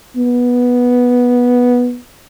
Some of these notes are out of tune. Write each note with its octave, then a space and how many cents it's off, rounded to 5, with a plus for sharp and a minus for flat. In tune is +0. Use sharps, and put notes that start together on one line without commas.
B3 -10